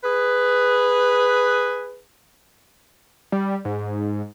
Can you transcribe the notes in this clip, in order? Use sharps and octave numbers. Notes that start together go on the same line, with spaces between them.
G#4 B4
G3
G#2